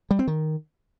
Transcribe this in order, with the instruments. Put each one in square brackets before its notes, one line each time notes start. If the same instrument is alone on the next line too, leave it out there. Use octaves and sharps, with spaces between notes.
[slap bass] G3
C4
D#3